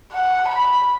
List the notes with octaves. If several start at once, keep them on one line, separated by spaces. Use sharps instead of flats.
F#5
B5